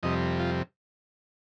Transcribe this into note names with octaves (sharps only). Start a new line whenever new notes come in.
F2 C3 G3 D#5
F4